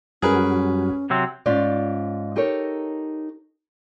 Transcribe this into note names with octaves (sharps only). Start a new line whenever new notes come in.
F#2 G3 C#4 F#4 G#4 A#4 B4
C3 F#3 C4
G#2 C#4 F4 D5
D#4 G4 A4 A#4 C#5